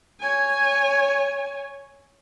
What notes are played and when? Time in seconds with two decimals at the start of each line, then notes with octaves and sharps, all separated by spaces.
0.20 C#5 G#5